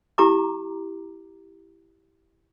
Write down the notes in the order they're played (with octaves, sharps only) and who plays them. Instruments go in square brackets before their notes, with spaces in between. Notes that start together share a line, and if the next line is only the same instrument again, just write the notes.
[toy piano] E4 G4 A#5 D6